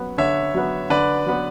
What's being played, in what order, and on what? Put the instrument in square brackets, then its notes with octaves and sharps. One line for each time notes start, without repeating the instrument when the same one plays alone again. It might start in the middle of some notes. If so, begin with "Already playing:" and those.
Already playing: [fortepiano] F#3 B3
[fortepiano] D3 [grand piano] C#5 E5
[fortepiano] F#3 B3
[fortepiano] D3 [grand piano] B4 D5
[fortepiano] F#3 B3